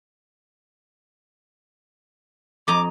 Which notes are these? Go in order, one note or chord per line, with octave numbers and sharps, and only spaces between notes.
F2 D#5 A#5 D6